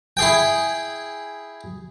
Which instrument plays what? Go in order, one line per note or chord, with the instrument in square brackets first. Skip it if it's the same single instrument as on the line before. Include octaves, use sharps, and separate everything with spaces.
[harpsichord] E4 G#4 G5